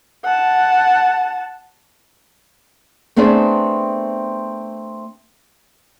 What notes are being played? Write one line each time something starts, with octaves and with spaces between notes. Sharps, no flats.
F#5 A5
A3 B3 C4 D4 G#4 C5